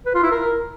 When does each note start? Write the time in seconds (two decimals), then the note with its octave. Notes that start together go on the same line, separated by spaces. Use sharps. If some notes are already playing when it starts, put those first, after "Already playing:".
0.06 B4
0.15 F4
0.23 E4
0.32 A#4